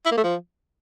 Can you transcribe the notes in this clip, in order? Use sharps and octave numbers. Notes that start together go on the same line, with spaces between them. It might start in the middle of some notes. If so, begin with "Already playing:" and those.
E4
A#3
A3
F3